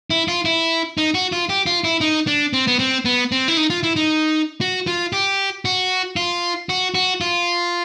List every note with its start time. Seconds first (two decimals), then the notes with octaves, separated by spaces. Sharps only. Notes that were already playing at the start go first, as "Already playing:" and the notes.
0.10 E4
0.28 F4
0.45 E4
0.98 D#4
1.14 F#4
1.32 F4
1.49 G4
1.66 F4
1.84 E4
2.01 D#4
2.27 D4
2.53 C4
2.67 B3
2.79 C4
3.05 B3
3.32 C4
3.48 E4
3.57 D#4
3.70 F4
3.83 E4
3.96 D#4
4.61 F#4
4.87 F4
5.13 G4
5.65 F#4
6.16 F4
6.69 F#4
6.95 F#4
7.21 F4